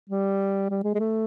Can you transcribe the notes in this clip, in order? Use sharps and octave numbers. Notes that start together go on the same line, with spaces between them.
G3
G3
G#3
G#3
A3